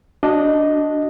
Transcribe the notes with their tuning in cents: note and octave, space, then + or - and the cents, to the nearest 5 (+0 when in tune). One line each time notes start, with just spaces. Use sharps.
D4 +0 F#4 +5 D#5 +0